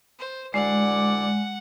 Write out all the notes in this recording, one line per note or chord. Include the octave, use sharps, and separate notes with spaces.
C5
D2 G#3 E4 D5 F#5